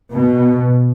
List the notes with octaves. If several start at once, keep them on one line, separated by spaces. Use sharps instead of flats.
B2